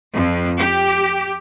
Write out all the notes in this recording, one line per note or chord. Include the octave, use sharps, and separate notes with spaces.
F2
G4